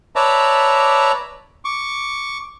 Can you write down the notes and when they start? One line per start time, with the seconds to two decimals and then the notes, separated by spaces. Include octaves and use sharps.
0.16 B4 C#5 D5 E5 A5 A#5
1.65 C#6 D6